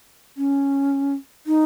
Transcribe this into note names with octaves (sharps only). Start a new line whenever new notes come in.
C#4
D#4